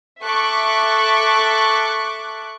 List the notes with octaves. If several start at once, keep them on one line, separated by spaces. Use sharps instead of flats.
A4 E5 C#6 D6 F#6